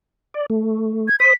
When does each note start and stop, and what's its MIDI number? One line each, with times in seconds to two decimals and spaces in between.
0.34 0.46 74
0.50 1.09 57
1.08 1.16 92
1.20 1.33 72
1.20 1.33 87
1.20 1.34 95